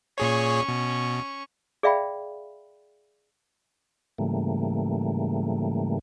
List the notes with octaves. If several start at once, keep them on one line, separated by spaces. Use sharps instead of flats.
A#2 C#4 G#4 C#5 C#6
B2
G#4 D5 E5 F5 G5 B5
G#2 C#3 E3 G3 A3 A#3